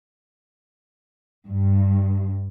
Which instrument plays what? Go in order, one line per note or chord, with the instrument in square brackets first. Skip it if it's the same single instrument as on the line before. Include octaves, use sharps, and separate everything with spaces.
[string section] G2